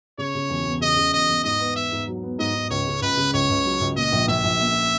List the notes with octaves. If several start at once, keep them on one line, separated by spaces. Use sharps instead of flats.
C#3 C#5
C#3
E1
E2
C#3 D#5
C#3
E1 D#5
E2
G#2 D#5
B3
B3 E5
G#2
F#3
B3
G#2 D#5
G#2
C#2 C#5
C#3
C#2 B4
C#3
C#2 C#5
C#2
F#3
C#2
A#2 D#5
A#1
A#1 E5
A#1
A#3